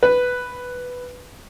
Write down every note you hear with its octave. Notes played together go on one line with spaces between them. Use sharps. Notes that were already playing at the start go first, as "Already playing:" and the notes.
B4